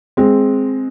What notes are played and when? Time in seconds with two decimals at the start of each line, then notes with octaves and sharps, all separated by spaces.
0.17 G#3 C4